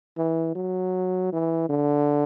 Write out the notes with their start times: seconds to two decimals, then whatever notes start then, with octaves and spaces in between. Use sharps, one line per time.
0.17 E3
0.55 F#3
1.32 E3
1.69 D3